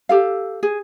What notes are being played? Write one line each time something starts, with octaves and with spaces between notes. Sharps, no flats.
G4 A4 F5
G#4